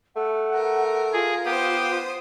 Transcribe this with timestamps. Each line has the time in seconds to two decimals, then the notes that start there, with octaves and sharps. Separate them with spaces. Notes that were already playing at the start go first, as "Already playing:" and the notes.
0.16 A3 F#5
0.53 A#4
1.13 F4 G#4
1.45 B3 G4 C5 D#6